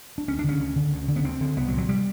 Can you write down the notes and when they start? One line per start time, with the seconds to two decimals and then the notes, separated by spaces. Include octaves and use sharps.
0.18 D4
0.28 D2 C#4
0.39 D4
0.44 D3 C#4
0.60 D2
0.76 D3
0.92 D2
1.08 D3
1.16 B3
1.24 D2 C4
1.41 D3
1.57 C2 B3
1.68 F#3
1.73 A#2
1.78 F#3
1.89 G3